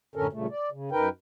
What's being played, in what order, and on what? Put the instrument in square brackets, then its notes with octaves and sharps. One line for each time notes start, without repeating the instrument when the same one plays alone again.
[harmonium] F#2 A2 D3 C#4 A4 A#4
G2 A#2 C#3 A3
D5
C#3
F#2 D#4 A#4 B4 G5